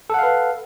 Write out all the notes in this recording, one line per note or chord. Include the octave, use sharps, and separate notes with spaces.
A4 B4 F5 F#5